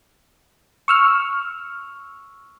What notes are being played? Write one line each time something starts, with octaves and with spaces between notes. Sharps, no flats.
C#6 E6 F6